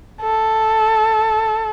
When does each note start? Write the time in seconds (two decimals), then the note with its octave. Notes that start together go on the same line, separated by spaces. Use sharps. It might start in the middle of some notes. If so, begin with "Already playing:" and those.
0.21 A4